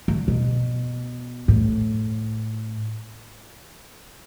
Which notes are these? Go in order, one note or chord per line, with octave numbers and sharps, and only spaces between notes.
D3
B2
A2